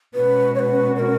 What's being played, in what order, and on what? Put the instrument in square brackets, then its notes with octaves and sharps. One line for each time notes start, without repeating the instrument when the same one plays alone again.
[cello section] B2 G#3 C#4 F#4 [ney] B4
[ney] C#5
B4
B4
A#4